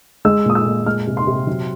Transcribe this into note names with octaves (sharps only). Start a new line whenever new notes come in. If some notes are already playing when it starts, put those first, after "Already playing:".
G#3 E6
A#2 D#6
E6
A#2
G#3 F6
C3
C6
C3
F#3